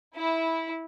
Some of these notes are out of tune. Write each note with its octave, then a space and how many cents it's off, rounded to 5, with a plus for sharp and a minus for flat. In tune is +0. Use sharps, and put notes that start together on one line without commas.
E4 -15